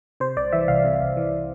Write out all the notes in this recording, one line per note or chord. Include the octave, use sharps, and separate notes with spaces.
C3 C5
C2 D5
E3 E5
C2 F5
C3
C2
E3